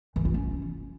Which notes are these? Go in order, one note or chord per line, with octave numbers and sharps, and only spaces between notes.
E3
F4
C#4